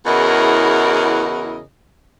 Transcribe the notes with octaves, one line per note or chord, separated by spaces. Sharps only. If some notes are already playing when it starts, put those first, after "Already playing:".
E2 C#3 E4 F#4 A#4 D#5